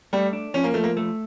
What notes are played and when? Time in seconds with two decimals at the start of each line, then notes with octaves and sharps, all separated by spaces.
0.13 G3 A3
0.33 D4
0.54 F3 C#4
0.64 A#3
0.74 F3 A3
0.84 A#3
0.97 A3